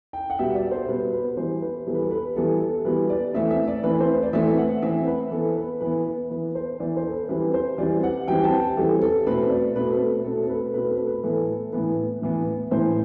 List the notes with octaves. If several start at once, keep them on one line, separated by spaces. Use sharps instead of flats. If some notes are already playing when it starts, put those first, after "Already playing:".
G5
F#5
B2 G3 B3 E5
D5
C5
B2 G3 B3 B4
B4
B4
E3 G3 B3 C5
B4
E3 G3 B3 A4
B4
A4
B4
E3 G3 B3 A4
A4
E3 G3 B3 B4
D5
E3 A3 C4 E5
E5
D5
E3 A3 C4 B4
C5
D5
E3 A3 C4 E5
F#5
E3 A3 C4 E5
B4
E3 B3 A4
B4
E3 B3 B4
B4
E3 B3 B4
C5
E3 B3 D5
C5
A4
B4
E3 G3 C4 B4
C5
E3 G3 C4 D5
F#5
E3 G3 C4 G5
A5
G5
E3 G3 C4 A4
A4
B2 A3 C4 B4
D5
B2 A3 C4 B4
A4
B2 A3 C4 A4
A4
B4
B2 A3 C4 B4
A4
B4
A2 E3 B3 A4
A2 E3 B3 B4
A2 E3 B3
A2 E3 B3 C5